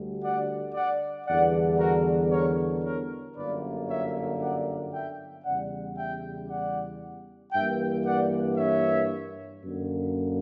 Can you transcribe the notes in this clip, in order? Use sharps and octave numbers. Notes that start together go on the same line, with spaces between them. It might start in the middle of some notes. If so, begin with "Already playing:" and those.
Already playing: D2 D3 G3
D5 F#5
D5 F#5
E2 D3 G3 B3 D5 F#5
F#4 A#4
A#4 C#5
A#4 C#5
G1 F#2 D3 A#3 B4 D5
C#5 E5
D5 F#5
E5 G5
E2 C#3 G3 D5 F#5
E5 G5
D5 F#5
G2 E3 A#3 E5 G5
D5 F#5
C#5 E5
F#2 D3 A#3